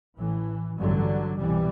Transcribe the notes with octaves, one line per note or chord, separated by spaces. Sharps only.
A1 A2 E3
A1 G2 D3 F#3
C2 B2 E3 G3